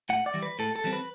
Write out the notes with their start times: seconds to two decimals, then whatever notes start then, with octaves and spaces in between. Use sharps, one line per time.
0.09 A2 F#5
0.26 D5
0.34 E3 G3
0.42 B4
0.59 A2 A4
0.76 A4
0.84 E3 G3 C4
0.93 B4